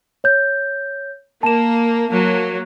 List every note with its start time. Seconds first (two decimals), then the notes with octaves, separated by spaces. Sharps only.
0.24 C#5 G6
1.43 A#3 A5 E7
2.09 F#3 A#3